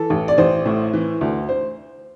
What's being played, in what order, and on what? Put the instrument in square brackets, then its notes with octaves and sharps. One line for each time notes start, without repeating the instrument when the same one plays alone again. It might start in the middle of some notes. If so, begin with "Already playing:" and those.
Already playing: [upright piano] E3 A4
A1
D5
A1 C5
A2
E3
D2
C5